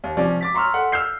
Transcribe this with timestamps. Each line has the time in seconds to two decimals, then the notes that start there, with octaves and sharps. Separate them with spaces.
0.04 D#2
0.17 C3 F3 C#4 D5
0.41 D6 A6 B6
0.55 A#5 C6 C#6 E6 F6
0.74 A4 F#5 C6
0.92 E6 F6 G6 C7